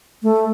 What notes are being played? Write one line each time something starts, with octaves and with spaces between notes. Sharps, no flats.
A3